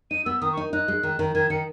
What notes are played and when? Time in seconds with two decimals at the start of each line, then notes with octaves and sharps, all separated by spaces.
0.11 D#4 D#7
0.26 B3 E6
0.41 D#3 D#6
0.52 C#6
0.57 D#4
0.73 D#4 F#6
0.88 G#3
1.03 D#3
1.19 D#3
1.35 D#3 G#6
1.50 D#3 C#7